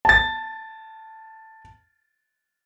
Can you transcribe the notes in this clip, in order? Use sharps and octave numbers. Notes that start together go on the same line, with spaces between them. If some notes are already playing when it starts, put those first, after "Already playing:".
A5 A6